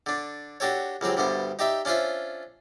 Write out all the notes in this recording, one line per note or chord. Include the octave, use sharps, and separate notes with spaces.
D3 D4
D4 F#4 G4 A4 C#5
C#2 F#3 C4 G4
D2 G2 D3 B3 C5
D#4 G4 D5 E5
C#4 D4 F4 C5 E5